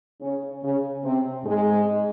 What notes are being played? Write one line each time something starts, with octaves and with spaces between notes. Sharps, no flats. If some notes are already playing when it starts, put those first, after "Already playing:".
C#3 C#4
C#3 C#4
C3 C4
G#2 G#3